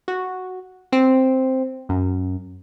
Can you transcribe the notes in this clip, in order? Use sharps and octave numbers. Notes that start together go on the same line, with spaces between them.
F#4
C4
F#2